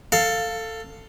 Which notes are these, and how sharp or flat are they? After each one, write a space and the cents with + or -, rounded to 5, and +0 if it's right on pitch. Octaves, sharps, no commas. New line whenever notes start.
A4 +15 F5 +0